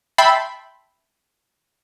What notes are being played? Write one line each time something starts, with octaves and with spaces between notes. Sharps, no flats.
E5 G5 A5 B5 C6